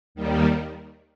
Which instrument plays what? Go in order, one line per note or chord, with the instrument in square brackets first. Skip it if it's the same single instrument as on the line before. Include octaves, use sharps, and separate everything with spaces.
[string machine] D#2 D#3 G3